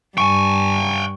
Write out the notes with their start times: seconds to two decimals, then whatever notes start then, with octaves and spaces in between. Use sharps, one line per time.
0.18 G2 G5 G#5 C#6